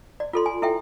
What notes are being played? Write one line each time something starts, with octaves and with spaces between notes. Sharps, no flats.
D5
F4 A4 C6
G#5
E4 A4 E5 G5